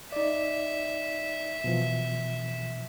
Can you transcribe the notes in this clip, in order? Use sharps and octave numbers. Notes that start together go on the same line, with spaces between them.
D#4 D5 E5
B2 E3 F3